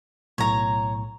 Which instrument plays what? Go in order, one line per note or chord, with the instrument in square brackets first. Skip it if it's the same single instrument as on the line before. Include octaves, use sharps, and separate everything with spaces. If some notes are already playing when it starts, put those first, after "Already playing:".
[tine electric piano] B1 A2 [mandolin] C#5 A#5